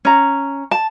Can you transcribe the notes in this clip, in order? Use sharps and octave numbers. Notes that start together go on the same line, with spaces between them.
C#4 A#5
A5